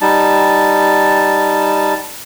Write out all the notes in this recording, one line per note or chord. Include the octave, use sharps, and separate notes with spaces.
G3 D#4 A5